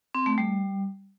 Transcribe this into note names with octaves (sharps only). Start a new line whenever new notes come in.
C4
A3
G3